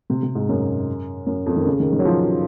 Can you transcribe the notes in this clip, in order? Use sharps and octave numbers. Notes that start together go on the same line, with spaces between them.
C3
C3
G#2
F#2
F#2
F2
D#3
C#3
D#3
D#3
F#3
F3